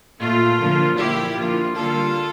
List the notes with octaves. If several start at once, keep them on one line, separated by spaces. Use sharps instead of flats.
A#2 A3 F4
D3 F3 A#3
A#2 F3 A#3 E4 G4
D3 F3 A#3 F4
D3 G3 A#3 F4 A4